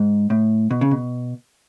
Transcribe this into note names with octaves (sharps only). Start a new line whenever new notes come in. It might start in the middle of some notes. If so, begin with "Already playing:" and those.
Already playing: G#2
A2
B2
C#3
B2